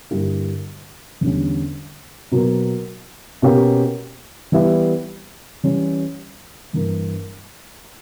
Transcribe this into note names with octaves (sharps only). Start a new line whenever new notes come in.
G2 D3 A#3 E4 G4
E2 D3 G3 C#4
B2 F#3 A#3
B2 A#3 C#4 G4
E3 G3 B3 E4 G4
E3 G3 C#4
G2 E3 A#3